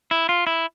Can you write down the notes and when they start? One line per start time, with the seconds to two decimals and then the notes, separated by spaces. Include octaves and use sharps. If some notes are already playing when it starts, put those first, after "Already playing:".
0.11 E4
0.29 F4
0.47 E4